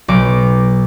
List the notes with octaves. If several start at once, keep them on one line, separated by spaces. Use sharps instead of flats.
B1 D6